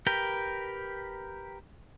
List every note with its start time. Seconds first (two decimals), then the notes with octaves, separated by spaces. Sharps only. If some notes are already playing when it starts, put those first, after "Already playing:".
0.07 G4 A#4 B4 G5